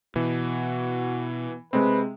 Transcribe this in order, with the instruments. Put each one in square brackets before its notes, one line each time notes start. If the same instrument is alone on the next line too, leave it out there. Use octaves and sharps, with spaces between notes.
[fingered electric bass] B2 [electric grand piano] E3 [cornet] F#4
[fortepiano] C3 G#3 [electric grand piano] C4 [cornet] B4